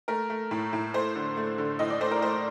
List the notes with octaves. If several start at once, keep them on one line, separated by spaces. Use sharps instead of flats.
A3 A#4
A3
A2
A2
A3 C5
D3
A3
D3
A2 D#5
D5
A3 C5
A#4
A3 C5